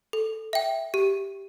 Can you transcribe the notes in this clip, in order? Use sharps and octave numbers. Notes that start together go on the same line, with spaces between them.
A4
E5 G5
G4